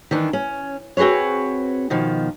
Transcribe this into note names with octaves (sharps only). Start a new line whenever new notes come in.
D#3 E3 D4
C#4
C4 F#4 G#4 B4 C#5
B2 D#3 F3